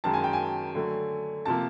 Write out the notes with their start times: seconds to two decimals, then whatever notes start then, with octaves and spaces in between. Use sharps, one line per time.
0.04 F#2 D#3 G#3 A5
0.14 G#5
0.24 G5
0.33 G#5
0.75 D3 F#3 A3
1.46 C3 F3 A#3 A5